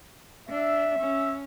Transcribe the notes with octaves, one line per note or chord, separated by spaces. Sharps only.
D4 E5
C#4